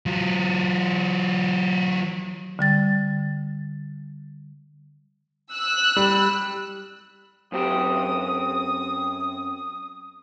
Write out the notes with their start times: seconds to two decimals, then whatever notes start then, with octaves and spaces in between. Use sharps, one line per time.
0.06 F#3 F4
2.59 D3 G3 A6
5.52 E6 F#6
5.96 G3
7.52 F#2 C4 G4 D#6